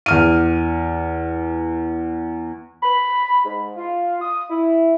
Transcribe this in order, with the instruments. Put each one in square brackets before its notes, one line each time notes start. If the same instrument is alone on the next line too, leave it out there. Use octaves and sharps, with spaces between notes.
[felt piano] E2 F6 D#7
[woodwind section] B5
G#2
F4
D#6
E4